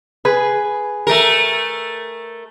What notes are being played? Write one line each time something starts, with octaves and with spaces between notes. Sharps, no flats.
G#4 B4
A3 A#4